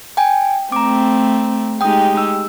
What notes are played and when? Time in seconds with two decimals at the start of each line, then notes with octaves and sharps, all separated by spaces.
0.17 G5 G#5
0.72 A3 C4 A#5 D6
1.81 G#3 D#4 G4 G5 D#6
2.17 E6